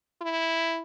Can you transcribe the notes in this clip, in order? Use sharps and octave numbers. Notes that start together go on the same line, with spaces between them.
E4